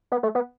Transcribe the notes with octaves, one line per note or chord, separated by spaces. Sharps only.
B3
A3
B3